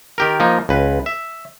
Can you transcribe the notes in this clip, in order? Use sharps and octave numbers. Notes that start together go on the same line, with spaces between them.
D#3 G4 A#4
F3 A#3 D#4
C#2 B4
E5